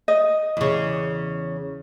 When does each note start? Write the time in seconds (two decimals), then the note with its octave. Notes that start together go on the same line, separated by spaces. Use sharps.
0.08 D#5
0.57 E2 C#3